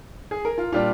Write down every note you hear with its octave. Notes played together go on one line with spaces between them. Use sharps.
G#4
A#4
F4
A#2 G3 D4 F4